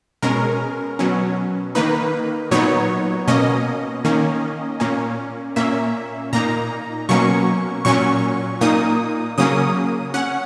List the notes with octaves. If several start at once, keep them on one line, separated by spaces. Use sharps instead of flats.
B2 G#3 C#4 A#4
B2 F#3 C#4
D#3 A#3 D#4 B4
A#2 F#3 B3 D#4 C#5
B2 A#3 C#4 D#5
D#3 A#3 C#4
A#2 A#3 C#4
A#2 A#3 C#4 E5
A#2 A#3 D#4 A#5
B2 F#3 A#3 C#4 C#6
A#2 F#3 C#4 C#6
A#2 A#3 D#4 D#6
C#3 F#3 A#3 C#4 D#6
C#4 F#5